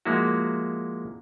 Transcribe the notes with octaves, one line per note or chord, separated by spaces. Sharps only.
F3 G#3 A#3 E4 F#4